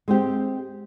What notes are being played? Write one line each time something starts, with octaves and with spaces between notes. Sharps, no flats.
G#3 C4 G4